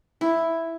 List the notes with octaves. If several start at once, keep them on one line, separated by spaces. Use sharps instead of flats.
E4